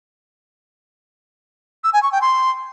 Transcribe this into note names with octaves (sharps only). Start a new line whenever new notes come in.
E6
G#5
C#6
G5
C6